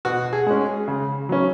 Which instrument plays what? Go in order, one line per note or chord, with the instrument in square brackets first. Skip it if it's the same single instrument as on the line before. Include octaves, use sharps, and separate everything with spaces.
[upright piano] B2 [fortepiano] F#4
[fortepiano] G#4
[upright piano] G#3 C#4
C#3
F#3 C#4